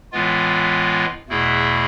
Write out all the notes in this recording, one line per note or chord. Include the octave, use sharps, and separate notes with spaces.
A2 E3 G#3 B3 F4
E2 B2 A3 E4 G#4